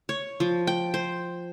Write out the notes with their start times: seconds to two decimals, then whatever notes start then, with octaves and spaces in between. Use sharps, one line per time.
0.09 C#5
0.40 F3
0.67 G5
0.94 C5